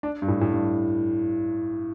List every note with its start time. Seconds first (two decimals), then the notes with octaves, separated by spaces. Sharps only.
0.03 D4
0.22 G2
0.28 A2
0.41 A2
0.53 G2